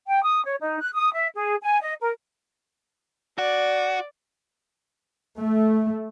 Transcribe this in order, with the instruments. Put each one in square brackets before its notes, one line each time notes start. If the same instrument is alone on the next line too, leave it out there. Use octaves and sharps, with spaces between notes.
[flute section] G5
D#6
C#5
D#4
F#6
D#6
E5
G#4
G#5
D#5
A#4
[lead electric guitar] F#4 [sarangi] D5
[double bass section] A3